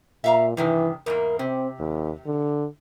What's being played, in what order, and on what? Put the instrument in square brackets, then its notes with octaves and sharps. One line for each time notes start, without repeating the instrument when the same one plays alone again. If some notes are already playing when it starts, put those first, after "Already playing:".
[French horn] A#2 [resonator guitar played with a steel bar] E5 F5 A#5
[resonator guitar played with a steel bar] G2 C3 D#3 [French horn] E3
[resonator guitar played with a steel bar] E2 G#2 A#3 [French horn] A#4
[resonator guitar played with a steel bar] C3 [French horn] C4
[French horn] D#2
D3